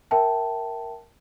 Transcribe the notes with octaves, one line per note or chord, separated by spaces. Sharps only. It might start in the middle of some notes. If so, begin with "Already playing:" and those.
A#4 E5 G5 A5